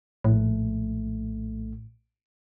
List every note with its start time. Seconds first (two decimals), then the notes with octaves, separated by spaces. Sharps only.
0.24 A#1 A2 A3